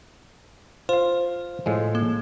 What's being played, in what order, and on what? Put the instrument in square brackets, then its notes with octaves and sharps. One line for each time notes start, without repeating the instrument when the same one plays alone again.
[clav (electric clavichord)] F4 F5 [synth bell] C5
[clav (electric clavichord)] A2 F3 G#3
[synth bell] A#3